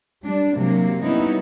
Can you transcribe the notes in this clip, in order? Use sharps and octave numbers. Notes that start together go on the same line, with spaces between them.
G3 D4
C3 F#3 A#3
G3 B3 C#4 D#4 E4